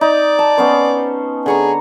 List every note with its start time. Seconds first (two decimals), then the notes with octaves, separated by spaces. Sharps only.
0.01 D#4 D5
0.39 A5
0.58 B3 C#4 C5
1.46 D3 G#4 C#5 A#5